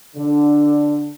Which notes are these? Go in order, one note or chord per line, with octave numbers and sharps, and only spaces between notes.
D3